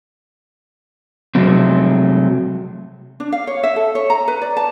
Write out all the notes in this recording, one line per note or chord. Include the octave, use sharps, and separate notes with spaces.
C3 F3 F#3 G#3 A3 C4
D4
F5
C#5
E5
A4
C#5
A#5
B4
D5
A5